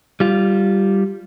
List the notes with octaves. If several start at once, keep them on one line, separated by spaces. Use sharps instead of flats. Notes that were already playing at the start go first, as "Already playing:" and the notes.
G3 F4